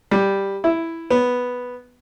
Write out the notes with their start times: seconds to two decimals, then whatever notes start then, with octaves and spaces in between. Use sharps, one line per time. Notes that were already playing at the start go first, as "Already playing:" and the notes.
0.11 G3
0.64 E4
1.10 B3